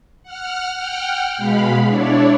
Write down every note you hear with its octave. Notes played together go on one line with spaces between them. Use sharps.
F#5 F6
F#5 G5 F6
B2 G#3 F5 B5
D4 E4 C#5 D5